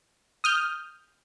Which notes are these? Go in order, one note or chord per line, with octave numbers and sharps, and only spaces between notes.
D#6 F6 G6